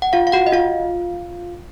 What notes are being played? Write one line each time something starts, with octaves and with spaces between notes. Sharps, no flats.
F#5
F4 F5
F5
F#4 F#5
D#5
F4 F5